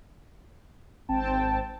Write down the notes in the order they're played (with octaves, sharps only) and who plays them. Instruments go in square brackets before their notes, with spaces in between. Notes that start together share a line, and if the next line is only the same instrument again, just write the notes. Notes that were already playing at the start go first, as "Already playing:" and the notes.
[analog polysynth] G#1 C4 G5 A5